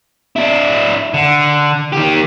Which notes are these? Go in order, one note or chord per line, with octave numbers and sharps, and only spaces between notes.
D4 E4
D3
D#3 G4